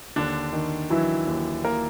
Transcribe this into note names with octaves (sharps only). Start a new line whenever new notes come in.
D#2 D3 D4
D#3
E3 F#3 E4
D#2
A#3 A#4